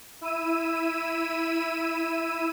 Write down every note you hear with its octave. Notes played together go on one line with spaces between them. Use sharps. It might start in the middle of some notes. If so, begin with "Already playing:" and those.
E4 E6 D#7